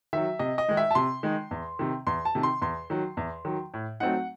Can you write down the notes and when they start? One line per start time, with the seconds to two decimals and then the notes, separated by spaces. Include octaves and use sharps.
0.13 D#3 F#3 E5
0.39 C3 D#5
0.58 D#5
0.68 D#3 G#3 D#4
0.77 E5
0.91 A5
0.95 C3 C6
1.23 D#3 G#3 D#4
1.51 E2
1.79 C3 D#3
2.07 E2 C6
2.25 A5
2.35 C3 D#3
2.43 C6
2.62 E2 C6
2.90 D#3 F#3
3.17 E2
3.45 D#3 F#3
3.74 A2
4.00 F#3 A3 C4 D#4 F#5